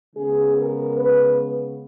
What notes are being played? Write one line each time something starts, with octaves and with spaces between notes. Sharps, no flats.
C#3 G#3 B3 G#4
A#4
B4